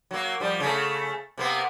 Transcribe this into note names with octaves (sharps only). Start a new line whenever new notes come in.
F#3 A#3
F3 G3
C#3 A3
C3 A#3 B3